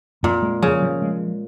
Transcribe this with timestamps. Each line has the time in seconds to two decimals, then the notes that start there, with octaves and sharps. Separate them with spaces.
0.23 F2 A#2
0.42 G#3
0.62 C#3 F3
0.82 F3
1.02 G#3